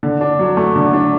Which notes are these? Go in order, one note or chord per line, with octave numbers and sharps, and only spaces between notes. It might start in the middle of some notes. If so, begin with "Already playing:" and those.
D3
D4
F#3
A3
D3
D4